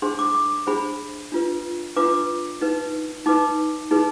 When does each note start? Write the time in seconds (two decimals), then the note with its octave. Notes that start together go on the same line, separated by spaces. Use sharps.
0.02 D4 G#4 C5 C6
0.19 D6
0.35 D6
0.67 D4 G#4 C5 B5
1.32 D4 F4 B4
1.96 D4 F4 B4 D6
2.61 D#4 B4
3.26 D#4 B4 D6
3.91 D#4 G#4 B4